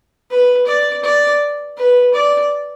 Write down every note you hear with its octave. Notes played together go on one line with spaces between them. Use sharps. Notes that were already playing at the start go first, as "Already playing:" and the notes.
B4
D5
D5
B4
D5